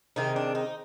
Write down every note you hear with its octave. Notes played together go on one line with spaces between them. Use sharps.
C3 D#3 G#3 C4 D#4
D4
D#4